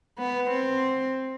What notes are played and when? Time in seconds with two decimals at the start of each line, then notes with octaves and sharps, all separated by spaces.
0.18 B3
0.50 C4